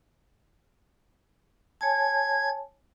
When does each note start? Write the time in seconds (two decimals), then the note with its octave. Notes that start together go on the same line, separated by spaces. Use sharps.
1.81 C#5 G#5 A5 G#6